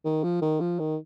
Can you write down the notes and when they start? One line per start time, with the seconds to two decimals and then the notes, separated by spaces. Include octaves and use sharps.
0.05 D#3
0.24 F3
0.42 D#3
0.60 F3
0.80 D#3